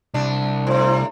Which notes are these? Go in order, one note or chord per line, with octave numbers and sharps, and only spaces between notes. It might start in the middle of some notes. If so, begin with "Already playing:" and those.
C2 D4
A2 C3 C5